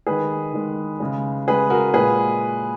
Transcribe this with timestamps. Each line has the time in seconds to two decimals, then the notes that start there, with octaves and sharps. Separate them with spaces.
0.07 D#3 G#3 G#4 B4
0.53 D#3 G#3
1.00 C#3 G#3
1.47 C#3 G#3 G#4 B4
1.70 F#4 A#4
1.94 A#2 F3 G#3 G#4 B4